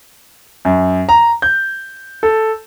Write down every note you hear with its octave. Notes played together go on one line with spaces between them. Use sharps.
F#2
A#5
G6
A4